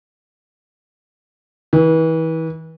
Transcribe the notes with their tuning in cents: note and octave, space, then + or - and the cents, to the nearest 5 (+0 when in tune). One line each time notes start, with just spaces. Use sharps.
E3 -35